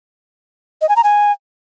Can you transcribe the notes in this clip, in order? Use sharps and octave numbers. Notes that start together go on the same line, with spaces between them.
D#5
G#5
A#5
G#5